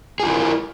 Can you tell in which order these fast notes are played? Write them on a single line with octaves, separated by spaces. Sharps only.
G#4 F4 E4 A#4